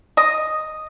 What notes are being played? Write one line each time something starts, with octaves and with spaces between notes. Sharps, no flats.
D#5